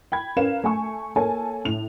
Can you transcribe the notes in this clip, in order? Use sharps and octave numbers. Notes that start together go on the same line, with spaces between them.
G5 B5 G#6
C#4 A#4 B4 F5 E7
A3 G#5 C#6
A#3 A4 C#5 G#5 A5
A2 F7